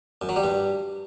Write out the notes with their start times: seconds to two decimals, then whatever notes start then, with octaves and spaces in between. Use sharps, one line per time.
0.22 F#2
0.29 F#3
0.36 G3
0.44 G2